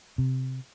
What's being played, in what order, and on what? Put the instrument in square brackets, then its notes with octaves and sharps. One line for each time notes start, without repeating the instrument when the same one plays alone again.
[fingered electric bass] C3